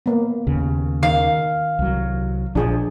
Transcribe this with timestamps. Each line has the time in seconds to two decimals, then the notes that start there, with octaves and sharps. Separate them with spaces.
0.06 A#3 B3
0.47 D#2 C#3
1.03 D#3 F5
1.79 C2 F#3
2.55 A#1 F3 D4 G#4